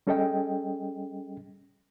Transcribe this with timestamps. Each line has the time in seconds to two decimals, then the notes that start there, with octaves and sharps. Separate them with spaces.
0.07 G3 C#4 G#4 A4 D#5 G5